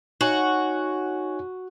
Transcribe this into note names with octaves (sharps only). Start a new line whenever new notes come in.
D#4 F#4 C#5 G#5